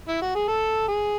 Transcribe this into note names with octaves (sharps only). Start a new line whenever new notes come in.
E4
F#4
G#4
A4
G#4